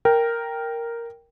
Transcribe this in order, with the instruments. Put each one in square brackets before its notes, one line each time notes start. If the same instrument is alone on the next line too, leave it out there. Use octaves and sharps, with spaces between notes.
[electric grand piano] A#4 G5